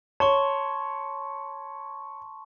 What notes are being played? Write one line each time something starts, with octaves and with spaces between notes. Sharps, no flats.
C#5 A5 C6 C#6